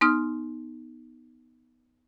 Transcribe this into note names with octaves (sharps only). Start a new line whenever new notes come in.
B3 D#4 D#6 F6